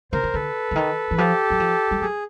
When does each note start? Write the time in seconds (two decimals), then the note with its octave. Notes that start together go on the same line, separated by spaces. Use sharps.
0.13 D3 A#4 C5
0.24 D3
0.34 D3 A4 B4
0.71 D3
0.76 D#3
1.11 E3
1.18 F3 G4 A4
1.50 F#3
1.60 F3
1.91 G3
2.01 F#3 G#4